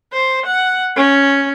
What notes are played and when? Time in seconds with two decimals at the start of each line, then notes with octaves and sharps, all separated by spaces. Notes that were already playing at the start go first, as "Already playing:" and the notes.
0.13 C5
0.46 F#5
0.97 C#4